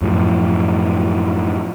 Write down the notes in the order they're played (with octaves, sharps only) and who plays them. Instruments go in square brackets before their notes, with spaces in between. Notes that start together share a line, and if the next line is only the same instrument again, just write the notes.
[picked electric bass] F#2 A2 F3